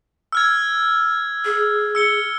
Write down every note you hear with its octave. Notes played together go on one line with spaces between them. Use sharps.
E6 F6 G#6
G#4
E6 C#7 G7